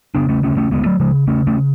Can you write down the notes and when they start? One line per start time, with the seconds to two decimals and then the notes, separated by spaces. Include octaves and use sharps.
0.15 C#3 B3 D4
0.29 A3 C#4
0.43 D2 A3 C#4
0.57 A3 C#4
0.71 D2 G#3 B3
0.85 F#3 A3
1.00 C#3 F3 G#3
1.27 C#3 A3 C#4
1.47 A3 C#4